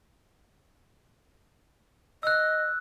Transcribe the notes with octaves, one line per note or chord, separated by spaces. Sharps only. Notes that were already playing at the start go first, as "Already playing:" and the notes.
D#5 E6 F#6